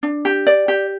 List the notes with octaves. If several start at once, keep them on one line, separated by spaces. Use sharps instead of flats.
D4
G4
D5
G4